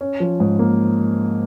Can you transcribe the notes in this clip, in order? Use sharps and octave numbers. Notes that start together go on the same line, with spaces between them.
C#4
F3
G#2
A#3